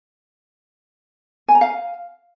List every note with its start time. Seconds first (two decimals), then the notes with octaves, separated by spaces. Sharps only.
1.48 G#5
1.55 A#5
1.61 F5